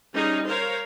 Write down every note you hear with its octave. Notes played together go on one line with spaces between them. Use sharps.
G3 C#4 D#4 G#4
A#4 C5 C#5 F5